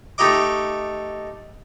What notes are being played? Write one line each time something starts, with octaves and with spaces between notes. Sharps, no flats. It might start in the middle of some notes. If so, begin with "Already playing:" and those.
A3 D#4 G4 D#5 D6